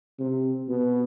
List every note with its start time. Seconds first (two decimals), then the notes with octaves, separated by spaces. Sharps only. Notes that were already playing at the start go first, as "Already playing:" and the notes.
0.19 C3
0.68 B2